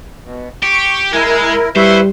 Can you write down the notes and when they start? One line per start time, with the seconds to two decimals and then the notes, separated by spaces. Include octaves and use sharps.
0.24 B2
0.63 G4 C#6
1.13 G#3 E4 A#4 G#5
1.76 G3 E4 B4 C5 E5 C#6